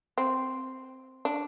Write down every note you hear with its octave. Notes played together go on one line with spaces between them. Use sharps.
C4
D4